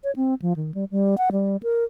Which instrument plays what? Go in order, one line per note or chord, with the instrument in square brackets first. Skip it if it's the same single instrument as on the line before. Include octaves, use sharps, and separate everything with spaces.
[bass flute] C#5
C4
F3
D#3
G3
G3
F#5
G3
A#4